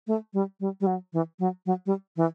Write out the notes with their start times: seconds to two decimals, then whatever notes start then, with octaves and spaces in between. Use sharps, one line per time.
0.07 A3
0.33 G3
0.60 G3
0.81 G3
0.87 F#3
1.13 E3
1.39 F#3
1.66 F#3
1.86 G3
2.17 E3